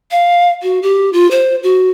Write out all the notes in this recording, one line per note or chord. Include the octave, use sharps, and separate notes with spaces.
F5
F#4
G4
F4
C5
F#4